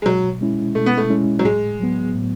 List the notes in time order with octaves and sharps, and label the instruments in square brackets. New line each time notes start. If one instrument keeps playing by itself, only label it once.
[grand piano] G#3
[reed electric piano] B2 [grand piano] F#3
[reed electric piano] G#3 C#4 E4
[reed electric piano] B2 [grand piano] A3
[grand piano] B3
A3
[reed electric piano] G#3 C#4 E4
[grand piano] F#3
[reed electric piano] A2 [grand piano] G#3
[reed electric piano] F#3 B3
A2